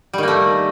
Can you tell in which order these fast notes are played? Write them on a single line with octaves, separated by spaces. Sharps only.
G3 D#3 A#3 A3